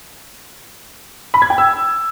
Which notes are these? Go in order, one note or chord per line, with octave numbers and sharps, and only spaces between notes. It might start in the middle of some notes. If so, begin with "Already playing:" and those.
B5
G#6
G5
E6